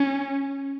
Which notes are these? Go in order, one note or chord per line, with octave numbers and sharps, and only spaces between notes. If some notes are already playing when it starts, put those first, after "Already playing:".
Already playing: C#4